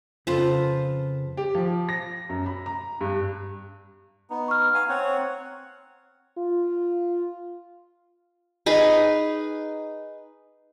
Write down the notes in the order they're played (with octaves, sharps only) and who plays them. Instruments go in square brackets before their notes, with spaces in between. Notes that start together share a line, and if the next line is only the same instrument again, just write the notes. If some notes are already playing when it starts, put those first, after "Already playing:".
[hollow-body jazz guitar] F2 C#3 A4 [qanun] F4 B4 C5
[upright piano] G4
F3
A#6
F#2
B5
A#5
G2
[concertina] B3 D#4
[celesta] C#6 F6
[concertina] F5 G#5 [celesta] A#5 C#6
[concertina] C4 C#5 F#5
[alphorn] F4
[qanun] D#4 G#4 B4